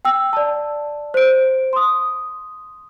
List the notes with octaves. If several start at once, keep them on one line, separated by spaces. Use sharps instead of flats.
G5 E6
D5 A5
C5 D7
C6 D#6